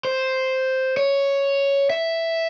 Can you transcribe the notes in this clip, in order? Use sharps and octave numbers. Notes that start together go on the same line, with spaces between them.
C5
C#5
E5